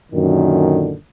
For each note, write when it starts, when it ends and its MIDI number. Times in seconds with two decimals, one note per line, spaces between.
0.12 0.95 42
0.12 0.95 46
0.12 0.95 50
0.12 0.95 51